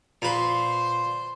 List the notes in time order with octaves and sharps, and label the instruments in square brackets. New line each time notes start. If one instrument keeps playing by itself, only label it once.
[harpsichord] A#2 B4 [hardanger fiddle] C5 C6